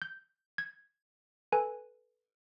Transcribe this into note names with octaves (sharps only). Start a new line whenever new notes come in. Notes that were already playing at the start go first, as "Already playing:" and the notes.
G6
G#6
A4 B4 G#5